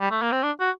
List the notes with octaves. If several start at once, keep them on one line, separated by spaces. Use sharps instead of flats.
G3
A3
A#3
C4
D4
F#4